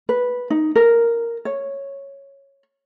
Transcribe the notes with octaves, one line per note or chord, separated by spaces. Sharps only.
B4
D#4
A#4
C#5